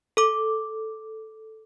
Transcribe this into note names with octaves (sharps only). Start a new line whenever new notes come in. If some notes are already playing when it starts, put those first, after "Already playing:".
A4 D6